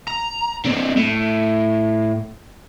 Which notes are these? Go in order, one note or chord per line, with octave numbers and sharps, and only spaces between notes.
A#5
D3 C4
A2